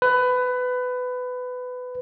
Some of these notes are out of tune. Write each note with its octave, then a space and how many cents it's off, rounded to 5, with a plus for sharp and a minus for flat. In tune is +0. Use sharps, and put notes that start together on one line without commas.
B4 +20